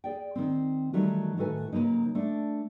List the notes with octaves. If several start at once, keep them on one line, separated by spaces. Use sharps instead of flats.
G#4 D5 G5
D#3 C4
D#3 E3 F#3 G3 A3
A2 D#3 F#4 A4 B4 G#5
C#3 F3 F#3 A#3 D#4
A3 D4